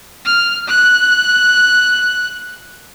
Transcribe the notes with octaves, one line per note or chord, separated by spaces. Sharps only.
F6
F#6